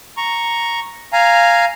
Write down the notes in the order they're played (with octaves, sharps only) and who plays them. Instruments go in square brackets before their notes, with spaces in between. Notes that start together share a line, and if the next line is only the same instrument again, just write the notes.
[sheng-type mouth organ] A#5 C#6
F5 G#5 A#5